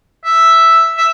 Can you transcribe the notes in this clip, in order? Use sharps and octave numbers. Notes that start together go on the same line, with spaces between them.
E5
E5